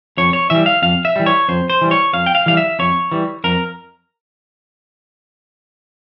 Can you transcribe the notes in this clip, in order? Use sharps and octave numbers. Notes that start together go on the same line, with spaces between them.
F2 C#5
C#5
E3 G3 E5
F5
F2 F5
E5
E3 G3
C#5
F2 C5
C5
E3 G3
C#5
F2 F5
G5
F5
E3 G3 F5
E5
F2 C#5
E3 G3
F2 A#4